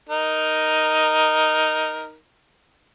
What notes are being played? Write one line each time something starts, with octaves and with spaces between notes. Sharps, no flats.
D#4 A#4